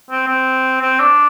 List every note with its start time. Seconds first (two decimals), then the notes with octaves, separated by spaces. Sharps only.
0.10 C4
0.28 C4
0.81 C4
0.99 D4